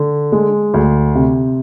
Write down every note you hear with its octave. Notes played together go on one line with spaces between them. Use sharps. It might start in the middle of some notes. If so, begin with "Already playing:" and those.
Already playing: D3
G#3
D2
C3